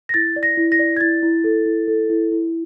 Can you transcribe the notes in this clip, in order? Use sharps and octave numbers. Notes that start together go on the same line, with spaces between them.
A#6
E4 A6
D5
A#6
E4
A#6
D5
G#6
E4 A6
E4
A4
E4
A4
E4
E4